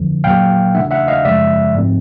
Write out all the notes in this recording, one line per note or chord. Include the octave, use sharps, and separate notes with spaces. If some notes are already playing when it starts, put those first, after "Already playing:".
Already playing: F2 D3 F3
A#2 F#3 A#3 F5 G5
C#3 E3 A3 D4 E5 F#5
E5 F#5
D#5 F5
F#2 C#3 F3 G#3 D5 E5
G#2 F3 A3 C4